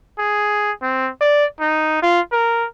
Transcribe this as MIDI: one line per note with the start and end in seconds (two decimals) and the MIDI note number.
0.19 0.72 68
0.82 1.10 60
1.21 1.46 74
1.60 1.97 63
2.02 2.21 65
2.33 2.66 70